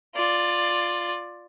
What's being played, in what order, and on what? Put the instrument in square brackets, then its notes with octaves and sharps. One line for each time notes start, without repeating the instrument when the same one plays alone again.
[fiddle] F4 D5